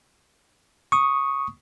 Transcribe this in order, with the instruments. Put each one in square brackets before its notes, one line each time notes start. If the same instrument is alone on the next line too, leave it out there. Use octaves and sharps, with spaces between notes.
[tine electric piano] C#6 D#6